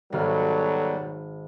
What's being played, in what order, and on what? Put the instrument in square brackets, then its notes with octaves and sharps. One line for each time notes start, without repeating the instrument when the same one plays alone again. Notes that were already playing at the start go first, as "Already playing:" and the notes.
[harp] G#1 F6 [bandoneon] B2 G3 [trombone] F#3 [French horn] A4